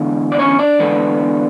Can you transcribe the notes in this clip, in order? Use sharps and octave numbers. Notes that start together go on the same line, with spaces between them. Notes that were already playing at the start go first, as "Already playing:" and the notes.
Already playing: E2 D3 G#3
D5
C#4 C#5
D4 D5
E2 D3 G#3 B3